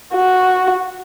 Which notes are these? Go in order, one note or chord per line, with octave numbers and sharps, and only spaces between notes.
F#4